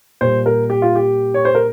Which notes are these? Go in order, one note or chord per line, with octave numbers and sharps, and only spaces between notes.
A#2 G3 C5
A#4
G4
F4
G4
C#5
C5
A#4